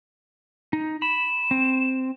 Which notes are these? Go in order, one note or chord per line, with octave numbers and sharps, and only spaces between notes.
D#4
B5 E7
C4